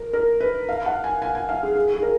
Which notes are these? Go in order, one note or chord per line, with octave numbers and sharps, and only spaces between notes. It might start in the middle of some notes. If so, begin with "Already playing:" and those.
Already playing: A#4
A#4
B4
F5
F#5
G#5
G#5
G#5
F5
G#4
G#4
G#4
A#4